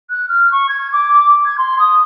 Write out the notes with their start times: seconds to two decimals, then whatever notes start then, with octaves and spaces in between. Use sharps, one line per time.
0.10 F#6
0.29 F6
0.51 C#6
0.69 G#6
0.93 D6
1.45 G#6
1.58 C6
1.79 D#6